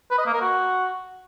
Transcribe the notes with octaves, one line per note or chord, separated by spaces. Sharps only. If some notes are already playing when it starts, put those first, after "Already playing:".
B4
D#5
A#3
A#4
F#4